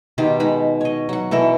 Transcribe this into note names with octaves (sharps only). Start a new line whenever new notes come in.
B2 D#3 G4 C6
G#3 D#4 B5
C#5 D#5
F#3 F#5
B2 E3 A4 A#4